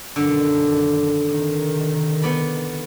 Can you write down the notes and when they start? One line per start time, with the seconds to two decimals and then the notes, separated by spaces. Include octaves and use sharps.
0.16 F#2 B2 D3 D#3
1.27 C3 D#3
2.22 B3 D5 B5